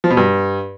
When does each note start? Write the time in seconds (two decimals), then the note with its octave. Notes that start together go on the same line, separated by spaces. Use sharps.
0.04 F3
0.10 B2
0.17 G2